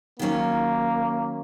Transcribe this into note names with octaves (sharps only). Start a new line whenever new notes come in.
D#3 F#3 A#3 C#4